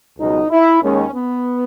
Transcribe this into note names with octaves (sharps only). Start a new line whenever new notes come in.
C#2 B2 F#3 D#4
E4
D#2 D#3 G#3 C#4
B3